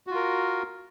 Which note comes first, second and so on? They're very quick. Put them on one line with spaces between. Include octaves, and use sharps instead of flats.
F#4 F4 A#4